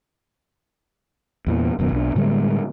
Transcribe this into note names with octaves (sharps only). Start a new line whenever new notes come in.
E2 A#2 E3
E1 F#2 B2 D#3
B1 D4
A2 D3 G3 G#3